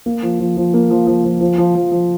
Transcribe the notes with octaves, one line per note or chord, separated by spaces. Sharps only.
A#3
F3
F3
F3
A#3
F3
F3
F3
F3
F3
F3
F3